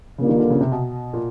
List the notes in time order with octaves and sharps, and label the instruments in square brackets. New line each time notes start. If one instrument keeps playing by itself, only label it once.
[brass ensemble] A#2 G3 A#3 D4 F4 [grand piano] C#3
[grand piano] D#3
D3
C#3
C3
B2
A#2